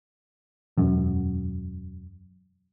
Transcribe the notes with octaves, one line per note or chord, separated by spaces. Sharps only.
E1 F#2